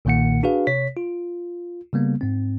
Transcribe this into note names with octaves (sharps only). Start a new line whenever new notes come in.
B1 A#2 D#3 A#3 F#5 C#7
D4 F#4 G#4 B4 F5
C3 C#5 B6
F4
C#3 G3 A#3 B3
G#2 C4